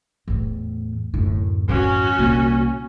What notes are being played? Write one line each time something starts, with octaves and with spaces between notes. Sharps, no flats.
E2 A2
D1 F#2 A2 E4
E3 C#4 F#4
C2 A#2 A#3